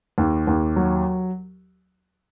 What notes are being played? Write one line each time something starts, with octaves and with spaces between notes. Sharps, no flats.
D#2
D#2
F#3